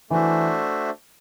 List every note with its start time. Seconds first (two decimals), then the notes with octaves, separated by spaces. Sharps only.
0.10 E3 A3 D4 F#4 C5 E5